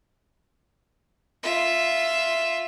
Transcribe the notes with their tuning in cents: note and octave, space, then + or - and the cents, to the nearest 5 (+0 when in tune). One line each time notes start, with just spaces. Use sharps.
F4 +0 E5 +5